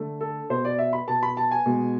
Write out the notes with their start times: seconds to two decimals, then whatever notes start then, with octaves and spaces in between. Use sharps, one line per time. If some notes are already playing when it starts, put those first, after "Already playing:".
Already playing: D3 A3
0.21 A4
0.50 B2 B3 C5
0.65 D5
0.79 E5
0.93 B5
1.07 B2 B3 A5
1.23 B5
1.37 A5
1.51 G#5
1.66 B2 G#3 B3